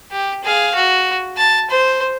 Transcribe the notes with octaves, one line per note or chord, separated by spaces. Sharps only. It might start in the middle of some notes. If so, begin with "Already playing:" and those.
G4
G#4 F5
F#4
A5
C5